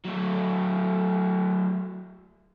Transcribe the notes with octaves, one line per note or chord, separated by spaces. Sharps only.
F#3 A3